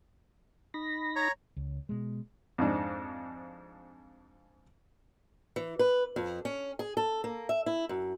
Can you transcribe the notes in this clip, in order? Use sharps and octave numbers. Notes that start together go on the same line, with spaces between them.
D#4 B5 A#6
C#5 A#5
C#2
B2 G#3
F2 G#2 D4
E3
B4
F2
C#4
G#4
A4
A#3
E5
E4
F#2